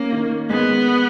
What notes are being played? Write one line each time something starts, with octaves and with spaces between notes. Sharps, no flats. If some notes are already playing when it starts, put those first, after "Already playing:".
Already playing: A#3 C#4
D#3
G#3 B3